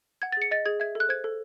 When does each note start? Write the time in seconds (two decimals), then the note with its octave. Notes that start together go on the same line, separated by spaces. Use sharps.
0.22 F#5 G#6
0.32 A6
0.37 G#4 C#7
0.51 D#5 A6
0.66 G#4 G#6
0.80 E5 G#6
0.95 A4 F#6
1.09 C5 G#6
1.24 A4